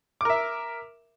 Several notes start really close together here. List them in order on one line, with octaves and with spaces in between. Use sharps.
D6 A#4 E5